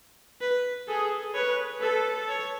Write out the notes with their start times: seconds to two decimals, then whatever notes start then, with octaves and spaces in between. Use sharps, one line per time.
0.41 B4
0.88 G#4 A4
1.34 B4 C#5
1.81 A4 B4
2.29 C#5